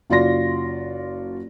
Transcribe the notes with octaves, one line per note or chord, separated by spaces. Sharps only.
F#1 F4 F#4 D5 C6 A#6